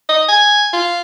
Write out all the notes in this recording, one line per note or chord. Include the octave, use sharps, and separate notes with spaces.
D#5
G#5
F4